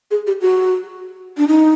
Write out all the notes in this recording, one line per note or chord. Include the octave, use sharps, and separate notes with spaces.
G#4
G4
F#4
D4
D#4